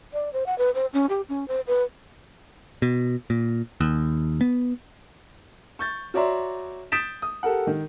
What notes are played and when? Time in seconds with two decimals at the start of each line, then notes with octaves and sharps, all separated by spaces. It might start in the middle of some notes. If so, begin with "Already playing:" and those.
0.13 D5
0.33 C5
0.46 F#5
0.58 B4
0.75 C5
0.93 C#4
1.09 G4
1.29 C#4
1.48 C5
1.67 B4
2.82 B2
3.30 A#2
3.81 D#2
4.41 B3
5.79 C#6 G6 A6
6.14 F#4 C#5 D5 E5 A#5 C6
6.92 D#6 G6 A6 B6 D7 E7
7.22 D#6
7.43 G4 A4 A#4 F#5
7.67 D#3